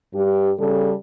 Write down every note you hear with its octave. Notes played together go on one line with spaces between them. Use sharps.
G2 G4
C#3 G3 A4